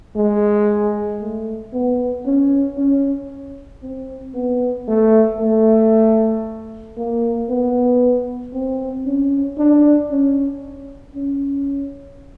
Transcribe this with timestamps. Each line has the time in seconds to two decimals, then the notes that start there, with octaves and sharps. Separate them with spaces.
0.16 G#3
1.21 A3
1.73 B3
2.26 C#4
2.78 C#4
3.83 C4
4.35 B3
4.88 A3
5.40 A3
6.97 A#3
7.50 B3
8.54 C4
9.06 C#4
9.58 D4
10.11 C#4
11.15 C#4